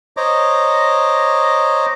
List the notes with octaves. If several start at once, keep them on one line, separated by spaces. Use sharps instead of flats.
C5 C#5 D#5 A#5 D6